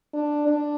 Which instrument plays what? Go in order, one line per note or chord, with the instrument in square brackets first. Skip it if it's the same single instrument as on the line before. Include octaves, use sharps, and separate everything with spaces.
[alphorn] D4
D4